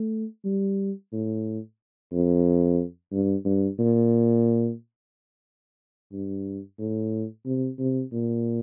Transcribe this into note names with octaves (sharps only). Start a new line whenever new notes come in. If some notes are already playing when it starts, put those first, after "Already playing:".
Already playing: A3
G3
A2
F2
G2
G2
A#2
G2
A2
C3
C3
A#2